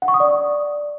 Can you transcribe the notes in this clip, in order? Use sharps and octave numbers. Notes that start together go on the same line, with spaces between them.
F#5
C#6
D#6
D5